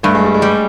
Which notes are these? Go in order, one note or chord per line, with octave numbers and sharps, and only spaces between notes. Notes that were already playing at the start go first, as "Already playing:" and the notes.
G2 A3
G#3
G3
G#3
G3